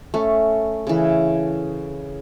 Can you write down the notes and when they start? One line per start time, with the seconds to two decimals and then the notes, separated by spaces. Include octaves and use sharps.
0.14 A3 C#4
0.87 C#3 E3